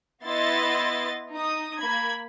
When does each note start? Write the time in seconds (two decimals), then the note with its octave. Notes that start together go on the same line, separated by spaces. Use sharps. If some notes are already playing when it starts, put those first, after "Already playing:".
0.24 B3 E4 D#5 C6 A6
1.34 D#4 D#6
1.78 A#3 B5 G#6